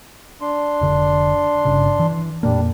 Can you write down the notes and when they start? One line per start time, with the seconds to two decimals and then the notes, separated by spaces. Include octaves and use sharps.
0.41 D4 C6
0.81 F1 D3
1.65 G1 C#3
1.99 E3
2.43 F2 A#2 G3 A#3 D4